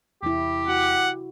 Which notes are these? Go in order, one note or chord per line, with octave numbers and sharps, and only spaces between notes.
E2 C3 E4 G4
F#4 F#5